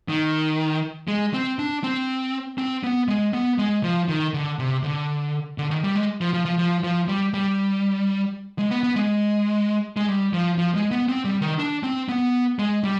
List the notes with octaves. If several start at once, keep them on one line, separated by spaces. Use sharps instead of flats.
D#3
G#3
C4
D4
C4
C4
B3
G#3
B3
G#3
F3
D#3
D3
C3
D3
D3
D#3
G3
G#3
F3
F3
F3
F3
F3
G3
G3
G#3
B3
B3
G#3
G#3
G3
F3
F3
G#3
B3
C4
G3
D#3
D4
C4
B3
G#3
G3